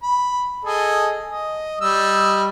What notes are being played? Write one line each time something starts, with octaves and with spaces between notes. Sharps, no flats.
B5
G#4 A4 D#5
D#5
G3 D#5 E6